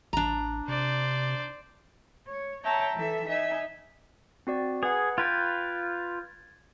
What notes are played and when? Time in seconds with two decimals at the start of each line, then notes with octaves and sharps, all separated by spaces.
0.13 A1 D4 A#5
0.68 C3 C5 D5
2.26 C#5
2.64 C#5 E5 G5 A5 A#5
2.95 E3 A4 E5
3.27 D#4 E5 G#5
4.47 C4 F#4 D5
4.83 G#4 B4 F#5
5.18 F4 B4 G5 G#6 A6